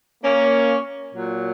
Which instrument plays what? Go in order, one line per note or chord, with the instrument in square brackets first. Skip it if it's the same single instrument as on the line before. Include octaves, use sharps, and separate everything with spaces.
[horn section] A#3 C#4
A#2 F#3